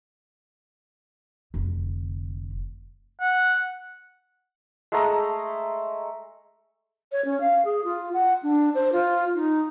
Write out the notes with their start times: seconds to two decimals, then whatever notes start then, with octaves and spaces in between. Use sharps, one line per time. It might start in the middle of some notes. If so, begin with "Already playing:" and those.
1.54 F1 D3
3.21 F#5
4.92 G#3 A3 A#5
7.12 C#5
7.25 C#4
7.41 F5
7.65 G#4
7.84 F4
8.14 F#5
8.43 D4
8.75 C5
8.93 F4
9.35 D#4